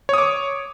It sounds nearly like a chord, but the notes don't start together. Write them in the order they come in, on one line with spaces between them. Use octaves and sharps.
C#5 D#6 D6